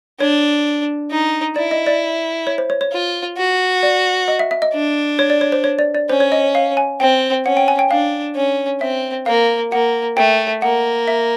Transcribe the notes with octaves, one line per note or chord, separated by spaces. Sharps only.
D4 C#5
D#4
E4 D5
D#5
D5
C#5
C5
C#5
C#5
F4
F#4
D5
D#5
E5
E5
D#5
D4
C#5
D5
C#5
C5
C#5
D5
D5
C#4 C5
C#5
D#5
F5
G#5
C4 G5
C#4 F#5
G5
G#5
G5
D4 F5
C#4
C4 E5
A#3 F5
A#3 F#5
A3 G5
A#3 F#5
E5